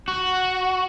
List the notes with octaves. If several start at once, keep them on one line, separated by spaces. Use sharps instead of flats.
F#4